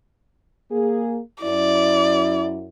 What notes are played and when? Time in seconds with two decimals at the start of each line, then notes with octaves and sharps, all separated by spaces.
0.71 A#3 G#4
1.43 F#2 E4 D5